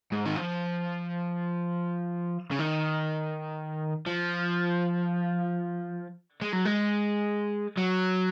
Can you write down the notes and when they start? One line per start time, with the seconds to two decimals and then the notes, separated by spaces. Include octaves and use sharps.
0.12 G#2
0.26 D#3
0.37 F3
2.51 C#3
2.59 D#3
4.07 F3
6.42 G#3
6.53 F#3
6.65 G#3
7.78 F#3